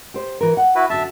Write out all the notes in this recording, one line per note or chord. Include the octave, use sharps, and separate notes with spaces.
G4 C5
E3 A#4
F#5
E4 F#4 B4
F#2 D3 E5 A5